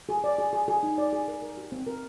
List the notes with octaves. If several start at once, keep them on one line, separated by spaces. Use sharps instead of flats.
G#4
D5
G#4
G#4
G#4
D#4
D5
G#4
A#4
A#4
G4
C4
A#4